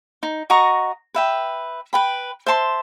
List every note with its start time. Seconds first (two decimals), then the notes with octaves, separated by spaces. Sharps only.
0.23 D#4
0.50 F#4 D#5 A#5 C#6
1.14 B4 E5 G5
1.93 B4 G5 B5
2.47 C5 E5 A5 C6